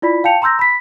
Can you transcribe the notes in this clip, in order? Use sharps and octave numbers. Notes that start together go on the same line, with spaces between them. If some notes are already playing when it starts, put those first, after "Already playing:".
E4 F4 D5 B5 B6
F5 G5 A5 G6 C#7 F7
A#5 C6 E6 G6 A#6
B5 B6